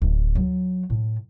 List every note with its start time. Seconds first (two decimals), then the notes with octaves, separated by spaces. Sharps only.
0.02 D1
0.35 F#3
0.90 A2